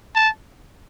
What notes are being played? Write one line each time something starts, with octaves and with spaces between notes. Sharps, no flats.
A5